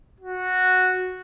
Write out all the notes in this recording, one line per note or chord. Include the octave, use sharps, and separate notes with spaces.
F#4